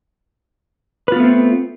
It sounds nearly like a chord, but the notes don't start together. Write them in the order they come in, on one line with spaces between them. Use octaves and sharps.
B4 F4 B3 A3 C4